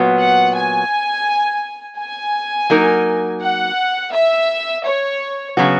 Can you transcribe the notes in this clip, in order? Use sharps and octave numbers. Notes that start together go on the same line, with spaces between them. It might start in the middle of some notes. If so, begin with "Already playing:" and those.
Already playing: A#2 F#3 B3
F#5
G#5
G#5
F#3 A#3 D#4 A#4
F#5
E5
C#5
C#3 F#3 B3 F#4